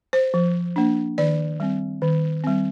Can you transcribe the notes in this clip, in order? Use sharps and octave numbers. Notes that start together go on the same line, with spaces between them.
C5
F3
A#3 D4
D#3 D5
G3 C4
D#3
G3 C4